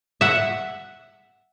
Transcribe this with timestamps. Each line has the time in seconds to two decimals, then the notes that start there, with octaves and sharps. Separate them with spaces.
0.21 E5 F#5